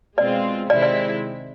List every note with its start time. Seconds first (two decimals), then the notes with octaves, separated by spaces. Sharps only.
0.18 B2 G#3 C4 F4 D5
0.70 C3 D#3 G#3 C4 E4 D5
0.83 D5